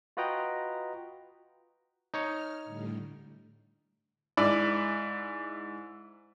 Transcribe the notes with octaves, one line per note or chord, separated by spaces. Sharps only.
F4 F#4 B4 D#5 G5 A#5
D#4 C#5 F6
A2 D3 G3
G#2 E4 D5